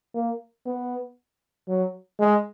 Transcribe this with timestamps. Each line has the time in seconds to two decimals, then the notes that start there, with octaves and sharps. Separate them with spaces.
0.15 A#3
0.66 B3
1.68 F#3
2.19 G#3